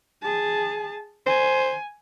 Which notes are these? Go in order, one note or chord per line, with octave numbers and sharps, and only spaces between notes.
G#4 A5
C5 G#5